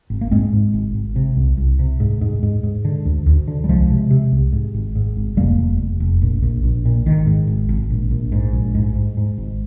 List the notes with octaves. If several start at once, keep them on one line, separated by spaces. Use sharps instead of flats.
G#1
A#3
G#2 G#3 C4
G#2
G#1
G#1
C3
C2
C2
C3
G#2
G#2
G#2
G#2
D3
D2
D2
D3
G3
C2 F3 G#3
C3
C3
C2
G#2
G#1
G#2
G#1
F1 G3 A#3
F1
F1
F1
A#1
A#1
A#1
A#2
G#1 D#3
G#2
G#1
G#1
A#1
A#1
G#2
A#1
G#2
G#2
G#2
G#1